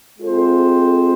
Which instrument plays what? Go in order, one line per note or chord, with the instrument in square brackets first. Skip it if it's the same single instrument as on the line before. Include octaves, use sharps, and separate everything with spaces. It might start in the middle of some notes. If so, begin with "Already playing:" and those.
[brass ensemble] G#3 C4 F4 A4 C5